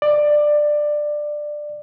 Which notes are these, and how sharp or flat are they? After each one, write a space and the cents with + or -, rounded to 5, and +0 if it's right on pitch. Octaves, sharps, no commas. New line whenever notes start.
D5 +15